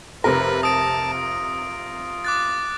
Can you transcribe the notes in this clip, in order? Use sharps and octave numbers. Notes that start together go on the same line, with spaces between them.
F1 C3 A#4 B4 A#6
A5 D#6 D7
F4
D6 F#6 A6